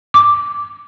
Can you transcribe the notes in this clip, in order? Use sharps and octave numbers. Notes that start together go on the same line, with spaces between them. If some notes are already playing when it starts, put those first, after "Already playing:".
D6